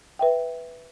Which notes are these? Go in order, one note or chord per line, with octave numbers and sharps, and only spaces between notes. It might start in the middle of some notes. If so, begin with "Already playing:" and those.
B4 E5 G5